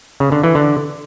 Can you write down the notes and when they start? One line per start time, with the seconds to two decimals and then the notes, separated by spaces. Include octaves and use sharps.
0.20 C#3
0.32 D3
0.43 E3
0.55 D3